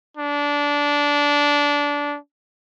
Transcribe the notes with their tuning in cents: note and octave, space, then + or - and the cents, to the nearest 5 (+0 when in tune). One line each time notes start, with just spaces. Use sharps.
D4 -20